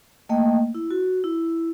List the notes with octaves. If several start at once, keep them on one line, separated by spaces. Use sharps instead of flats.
A3 A#3 D#5 G5
E4
F#4
E4